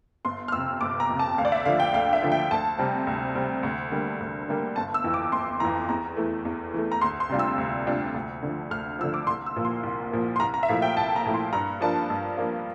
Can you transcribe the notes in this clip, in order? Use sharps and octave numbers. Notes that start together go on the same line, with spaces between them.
G1 C6
F6
F2 C3 E6
G1 D6
A#5
F2 C3
A5
D2 F5
D5
E5
D3 F3 F5
G5
D2 F5
E5
D3 F3
G5
D2 A5
C3 G3 C4
D2
C3 G3 C4
D2
D3 G3 A#3
D2
D3 G3 A#3
G1 A5
E6
F2 E3
D6
G1 C6
F2 E3 A#5
E2 A#5
E3 A3
E2
E3 A3
A#5
D2 C6
C6
C3 G3 D4 F4
E6
D2
C3 G3 D4 F4
D2
D3 F3
D2 F6
D3 F3 E6
D6
C2 C6
E6
A#2 F3 A#3
C6
C2
A#2 F3 A#3
C6
C2 A#5
A#5
E5
A#2 F3 A3 E4 F5
G5
C2 A5
A#5
A#2 F3 A3 E4
C6
G2 A#5
F3 A#3 D4 F4 A5
G2
F3 A#3 D4 F4